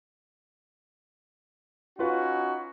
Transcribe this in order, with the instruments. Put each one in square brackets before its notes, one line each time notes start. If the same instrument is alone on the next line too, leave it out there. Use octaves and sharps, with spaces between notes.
[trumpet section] C#4 D#4 F#4 [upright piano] F4 B4 F5